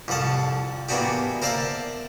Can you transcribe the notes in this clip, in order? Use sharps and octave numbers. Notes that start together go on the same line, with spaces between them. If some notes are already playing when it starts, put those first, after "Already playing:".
C2 F2 F3 F#5 A5
E3 A#3 B3 D4 F#4 G4
A#4 C5 D5 E5 F5 A5